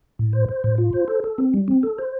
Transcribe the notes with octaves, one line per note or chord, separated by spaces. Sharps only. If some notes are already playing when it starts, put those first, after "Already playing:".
A2
C5
C5
A2
F4
C5
A4
A4
C4
G3
C4
A4
C5